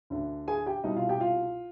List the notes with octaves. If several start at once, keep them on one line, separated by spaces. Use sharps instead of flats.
D2 D3
G#4 G#5
G4 G5
C2 B2 D#4 D#5
F4 F5
G4 G5
F4 F5